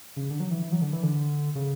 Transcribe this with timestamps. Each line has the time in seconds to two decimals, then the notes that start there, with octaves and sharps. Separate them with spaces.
0.16 C#3
0.30 D3
0.40 F#3
0.51 E3
0.62 E3
0.72 F#3
0.82 D3
0.93 E3
1.03 D3
1.55 C#3